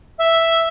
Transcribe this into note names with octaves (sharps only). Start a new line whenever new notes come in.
E5